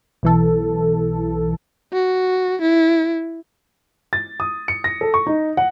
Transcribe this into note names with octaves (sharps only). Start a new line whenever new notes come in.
B1 E3 A4
F#4
E4
A6
D#6
C#7
A#6
A4
C#6
D#4
F#5